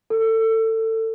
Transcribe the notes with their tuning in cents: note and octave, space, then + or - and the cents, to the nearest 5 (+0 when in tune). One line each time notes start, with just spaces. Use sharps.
A4 +25